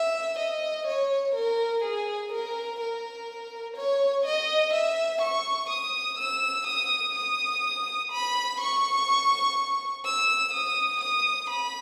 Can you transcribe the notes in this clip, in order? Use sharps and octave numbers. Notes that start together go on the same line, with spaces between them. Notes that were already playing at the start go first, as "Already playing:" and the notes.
Already playing: E5
D#5
C#5
A#4
G#4
A#4
A#4
C#5
D#5
E5
C#6
D#6
E6
D#6
D#6
B5
C#6
E6
D#6
D#6
B5